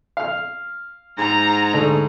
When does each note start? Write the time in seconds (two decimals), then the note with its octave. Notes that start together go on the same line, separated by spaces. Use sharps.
0.17 F5 F6
1.19 G#2 A#5
1.74 D2 A3